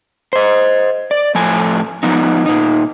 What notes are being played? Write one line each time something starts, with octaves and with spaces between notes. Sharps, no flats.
C5 D#5
D5
A2 F3 A3 G#5
F3 B3 D#4
A#2 D#4